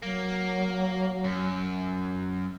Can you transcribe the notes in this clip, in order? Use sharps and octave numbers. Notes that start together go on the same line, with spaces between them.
F#3 A#3
F#2